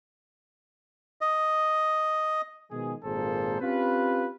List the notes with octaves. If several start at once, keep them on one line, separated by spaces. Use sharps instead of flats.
D#5
B2 D#3 F3 G#3 G#4
G#1 A#2 A#3 G#4 A4 C5
C4 C#4 F4 G4 B4